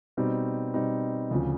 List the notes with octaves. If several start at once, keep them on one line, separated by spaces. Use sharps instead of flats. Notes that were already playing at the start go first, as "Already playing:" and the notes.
B2 G3 C4 D#4
B2 G3 C4 D#4
D2 C#3 F3